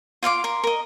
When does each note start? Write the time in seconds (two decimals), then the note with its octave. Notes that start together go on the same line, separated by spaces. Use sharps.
0.23 F4 F5 C6 D6
0.44 A#4 C6
0.64 A#4 D#5